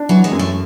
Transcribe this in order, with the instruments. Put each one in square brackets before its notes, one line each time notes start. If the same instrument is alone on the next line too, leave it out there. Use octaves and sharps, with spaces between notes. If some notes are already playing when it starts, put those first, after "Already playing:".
Already playing: [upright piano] D4
[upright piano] E3 [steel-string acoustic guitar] F#3
[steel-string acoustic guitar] G#3
[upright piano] F#2
[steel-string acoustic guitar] A3